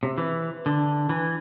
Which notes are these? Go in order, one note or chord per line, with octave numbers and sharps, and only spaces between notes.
C3
E3
D3
E3